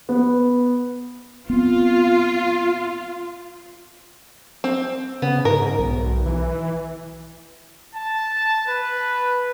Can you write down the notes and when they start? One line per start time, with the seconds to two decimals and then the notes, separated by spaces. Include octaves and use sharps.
0.09 B3
1.50 B3 C4 F4
4.64 C4
5.22 C#3 B3
5.45 G#2 A#4
5.79 B1
6.26 E3
7.95 A5
8.67 B4